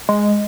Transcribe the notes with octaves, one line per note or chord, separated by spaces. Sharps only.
G#3